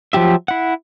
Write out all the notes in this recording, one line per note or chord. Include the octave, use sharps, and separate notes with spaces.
F3 F#3 G4 E5
E4 F#5